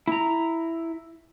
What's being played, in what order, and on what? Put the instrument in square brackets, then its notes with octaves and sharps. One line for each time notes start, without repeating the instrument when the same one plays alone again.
[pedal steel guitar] E4 A#5